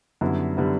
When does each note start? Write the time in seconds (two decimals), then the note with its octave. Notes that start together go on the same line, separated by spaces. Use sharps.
0.21 F#2 D3 G3 B3 E4
0.57 D3 G3 B3 E4